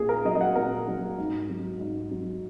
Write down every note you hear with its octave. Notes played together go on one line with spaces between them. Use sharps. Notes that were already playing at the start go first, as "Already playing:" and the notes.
Already playing: A#2 G#4
A#4
F#3 D#5
D#5
F#5
A#2 A#4
F#3
G#2
F#3
G#2
F#3